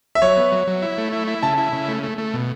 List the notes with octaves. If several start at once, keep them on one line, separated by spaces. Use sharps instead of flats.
E5
F#3 C#5
B3
F#3
F#3
E4
A3
E4
E4
C#3 A5
E4
C#3
A3
A3
A3
B2